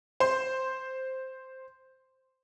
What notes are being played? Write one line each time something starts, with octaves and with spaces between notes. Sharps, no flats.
C5 C6